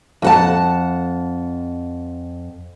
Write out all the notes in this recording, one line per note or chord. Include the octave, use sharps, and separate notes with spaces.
F2 F#5 A5